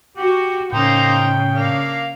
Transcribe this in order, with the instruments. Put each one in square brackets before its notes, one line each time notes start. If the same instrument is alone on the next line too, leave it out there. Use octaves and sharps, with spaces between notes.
[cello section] F#4 [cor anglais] G4
[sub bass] A2 [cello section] C#3 [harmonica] A#3 D#4 C5 [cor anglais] G5
[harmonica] A#3 D4 F5